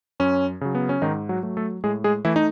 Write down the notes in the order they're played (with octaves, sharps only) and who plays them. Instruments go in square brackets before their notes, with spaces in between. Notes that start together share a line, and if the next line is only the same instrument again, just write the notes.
[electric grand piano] F#2 C#4
C#3 F#3
B3
C#4
G#2 D#3 D#4
F#3 F#4
F#3 A3
A3 A4
A2 G#3 G#4
G#3 G#4
E3 A3 E4
D#4